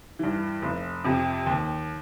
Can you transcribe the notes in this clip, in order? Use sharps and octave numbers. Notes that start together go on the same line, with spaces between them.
G2 E3
F1
F2 C3
D#2